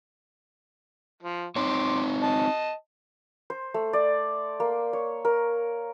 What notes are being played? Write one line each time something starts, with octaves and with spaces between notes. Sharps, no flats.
F3
C4 D#4 C#5 C6 D6
D#5 A5
C5
A3
D5
A#3
C#5
A#4